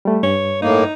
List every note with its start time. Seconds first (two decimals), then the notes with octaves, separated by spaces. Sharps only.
0.05 G3 A3
0.23 G2 C#5
0.62 A2 A#3 D#4